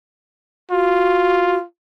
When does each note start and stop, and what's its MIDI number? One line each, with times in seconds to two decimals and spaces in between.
0.71 1.64 65
0.71 1.57 66